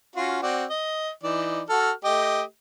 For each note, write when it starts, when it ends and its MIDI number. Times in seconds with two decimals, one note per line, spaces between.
0.16 0.40 61
0.16 0.40 65
0.16 0.40 66
0.42 0.65 60
0.42 0.65 66
0.42 0.65 74
0.70 1.10 75
1.23 1.62 52
1.23 1.62 63
1.23 1.62 74
1.69 1.91 66
1.69 1.91 69
1.69 1.91 89
2.04 2.42 57
2.04 2.42 67
2.04 2.42 75